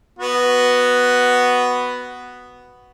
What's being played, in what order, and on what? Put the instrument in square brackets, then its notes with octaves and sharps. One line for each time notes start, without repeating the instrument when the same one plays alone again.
[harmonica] B3 F#4